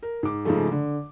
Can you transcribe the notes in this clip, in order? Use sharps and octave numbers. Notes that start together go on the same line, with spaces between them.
A#4
G#2 D6
G#2 C#3 F3 G#3 A3
D3